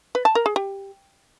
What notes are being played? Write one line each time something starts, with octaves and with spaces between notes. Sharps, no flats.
B4
A5
A#4
G#4
G4